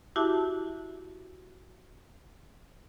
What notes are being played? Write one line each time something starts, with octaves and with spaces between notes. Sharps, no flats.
E4 F#4 G4 E5 A5 D6